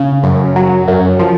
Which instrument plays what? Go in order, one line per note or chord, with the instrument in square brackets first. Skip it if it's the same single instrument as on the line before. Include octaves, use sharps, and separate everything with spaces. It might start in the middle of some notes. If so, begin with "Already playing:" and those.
Already playing: [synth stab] C#3
F#2
F#3
F#2
F3